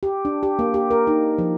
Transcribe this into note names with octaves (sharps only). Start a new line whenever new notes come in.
G4
D4
G4
A#3
G4
A#4
D#4
F3